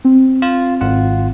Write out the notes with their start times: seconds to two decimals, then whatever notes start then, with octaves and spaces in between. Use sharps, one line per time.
0.05 C4
0.42 F4
0.81 G#1 F4 F#5